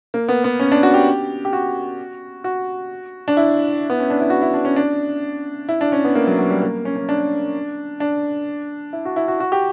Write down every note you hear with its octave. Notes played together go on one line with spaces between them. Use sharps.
A#3
B3
B3
C#4
D4
F#4
G4
G4
F#4
F#4
D4
E4
B3
C#4
D4
E4
F#4
E4
D4
C#4
D4
E4
D4
C#4
B3
A#3
F#3
F#3
G3
A#3
C#4
C#4
D4
D4
E4
F#4
E4
F#4
F#4
G4